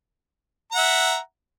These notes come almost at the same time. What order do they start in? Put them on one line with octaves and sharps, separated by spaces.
A#5 F#5 E5